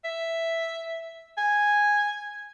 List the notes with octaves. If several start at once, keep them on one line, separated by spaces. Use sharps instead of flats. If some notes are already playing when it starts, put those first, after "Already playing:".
E5
G#5